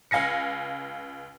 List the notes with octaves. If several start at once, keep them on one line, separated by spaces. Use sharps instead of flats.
C#2 F5 G#5 A#6 C#7